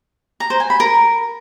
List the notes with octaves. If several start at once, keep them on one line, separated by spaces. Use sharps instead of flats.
A#5
C5
G#5
B5
A#4